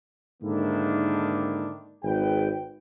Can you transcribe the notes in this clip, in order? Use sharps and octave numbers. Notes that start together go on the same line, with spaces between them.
G#2 D3 D#3 A#3 D4 E4
G#1 G#4 B4 G5